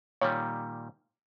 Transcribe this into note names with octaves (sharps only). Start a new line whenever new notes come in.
A#2 D#3 G3 C#5